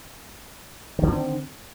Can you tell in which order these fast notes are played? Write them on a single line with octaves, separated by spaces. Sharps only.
D#3 D3 B3 C4